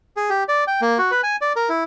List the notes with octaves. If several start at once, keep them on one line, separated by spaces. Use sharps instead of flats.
G#4
G4
D5
G5
A#3
F#4
B4
G#5
D5
A#4
E4